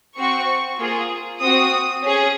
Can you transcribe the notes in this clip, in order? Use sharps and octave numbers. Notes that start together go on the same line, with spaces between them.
C4 F#4 C#6
A#3 F4 G#4
C4 F#4 D#6
C#4 G#4